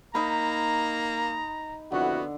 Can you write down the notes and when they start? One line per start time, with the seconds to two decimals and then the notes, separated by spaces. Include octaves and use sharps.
0.15 A#3 D#4 A#5 B5
1.92 F2 D3 B3 E4 F#4